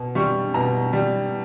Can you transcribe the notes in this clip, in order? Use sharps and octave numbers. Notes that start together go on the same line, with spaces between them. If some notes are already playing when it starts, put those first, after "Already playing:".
Already playing: B2
G3 C#6
B2 A#5
G3